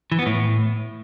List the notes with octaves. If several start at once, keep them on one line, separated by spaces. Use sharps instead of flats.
E3
B3
A2